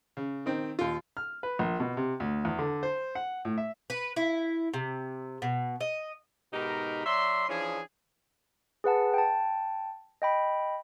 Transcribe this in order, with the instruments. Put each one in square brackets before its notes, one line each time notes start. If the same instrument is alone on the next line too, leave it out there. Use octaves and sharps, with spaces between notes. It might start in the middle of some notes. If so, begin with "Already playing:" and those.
[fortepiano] C#3
D#3 C4
D#2 F4
F6
B4
A#1
B2
C3
D2
E2
D3
C5
F#5
A2
E5
[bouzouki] B4
E4
C3
B2
D#5
[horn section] G#2 B2 D#4 G4 A#4 B5
F#3 D5 E5 C6
E3 F3 C#4 D4 G#4
[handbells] G#4 B4 F#5 A5
G5 A5
D#5 G5 B5